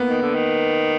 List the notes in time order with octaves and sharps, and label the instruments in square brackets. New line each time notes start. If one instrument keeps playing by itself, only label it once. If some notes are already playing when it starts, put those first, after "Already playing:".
Already playing: [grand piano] A#3 B3
[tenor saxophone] D#3
D3
D#3